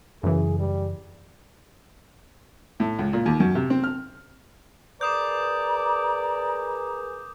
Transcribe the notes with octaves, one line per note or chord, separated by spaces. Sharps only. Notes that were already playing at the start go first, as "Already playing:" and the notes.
F#2 C#3 E3 G#4
G3
A2
C#2
A#2
D#2
F#2
C3
C4
F6
G#4 A#4 B4 D5 A#5 D6 D#6 G6